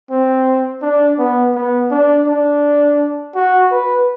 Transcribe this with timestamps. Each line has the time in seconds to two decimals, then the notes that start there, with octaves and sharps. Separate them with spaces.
0.10 C4
0.82 D4
1.18 B3
1.55 B3
1.91 D4
2.27 D4
3.35 F#4
3.71 B4